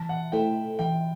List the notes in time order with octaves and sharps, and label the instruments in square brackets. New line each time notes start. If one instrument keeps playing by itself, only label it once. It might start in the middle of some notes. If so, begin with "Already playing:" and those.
Already playing: [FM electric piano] E3 [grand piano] A5
[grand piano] F#5
[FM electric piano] A3 E4 A4 C5 [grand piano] G5
[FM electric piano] E3 [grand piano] G5